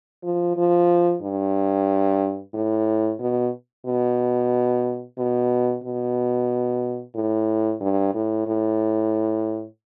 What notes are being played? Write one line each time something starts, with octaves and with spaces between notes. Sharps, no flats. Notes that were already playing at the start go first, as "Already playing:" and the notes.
F3
F3
G2
A2
B2
B2
B2
B2
A2
G2
A2
A2